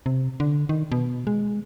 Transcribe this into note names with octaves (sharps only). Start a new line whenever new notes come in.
C3
D3
D#3
B2
G#3